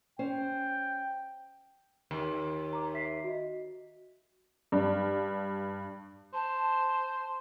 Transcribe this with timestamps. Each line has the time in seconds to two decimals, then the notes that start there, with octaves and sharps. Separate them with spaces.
0.19 C#4 C5 G5
2.11 D#2
2.73 A#5 D6
2.94 E5 B6 C7
3.24 F#4 D#5
4.72 G2
6.34 C5 A5